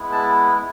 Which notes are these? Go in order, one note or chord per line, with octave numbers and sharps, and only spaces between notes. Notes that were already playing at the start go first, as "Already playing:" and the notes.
Already playing: G#3 B3 E4
A5